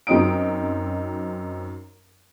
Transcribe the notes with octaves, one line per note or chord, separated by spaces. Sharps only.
F#2 F#3 C4 D#4 D#6 D7